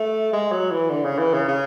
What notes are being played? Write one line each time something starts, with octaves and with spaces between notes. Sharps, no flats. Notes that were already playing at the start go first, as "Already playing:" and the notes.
Already playing: A3
G#3
F#3
E3
D3
C#3
E3
C#3
C#3